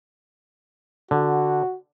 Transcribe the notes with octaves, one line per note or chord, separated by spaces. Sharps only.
D3 F#4